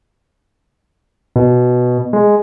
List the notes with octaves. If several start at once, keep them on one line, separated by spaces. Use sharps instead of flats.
B2
G#3